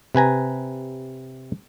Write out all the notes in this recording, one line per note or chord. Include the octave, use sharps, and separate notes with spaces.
C3 B4 G#5 A#5